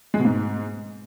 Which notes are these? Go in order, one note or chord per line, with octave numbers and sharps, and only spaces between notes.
G#3
B2
G#2